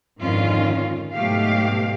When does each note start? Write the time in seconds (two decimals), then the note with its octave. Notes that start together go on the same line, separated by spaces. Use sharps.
0.19 F2 G#2 D3 D#3 C#4 F4
1.15 G#2 B2 F#3 A3 G4 F5